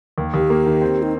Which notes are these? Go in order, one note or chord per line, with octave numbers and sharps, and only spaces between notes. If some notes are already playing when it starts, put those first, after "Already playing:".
D#2
D#2 G4
A#3
D#3
C4
D#4